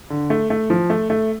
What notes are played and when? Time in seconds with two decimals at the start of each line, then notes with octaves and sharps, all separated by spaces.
0.10 D3
0.30 A3
0.50 A3
0.70 F3
0.90 A3
1.10 A3